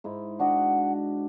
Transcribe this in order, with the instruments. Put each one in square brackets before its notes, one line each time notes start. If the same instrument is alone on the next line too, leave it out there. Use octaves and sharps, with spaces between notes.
[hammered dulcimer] G#2 D#4 E4
[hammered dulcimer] D4 F#4 D#5 [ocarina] F#5